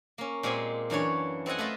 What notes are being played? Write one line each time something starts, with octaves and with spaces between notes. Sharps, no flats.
A#3 C#4
A#2 G#3 C4 G4 G#5
F#2 E3 D4 C#5
C4 A4 D#5 F#5 G#5
A3 F4 A4 B4 D#5 A5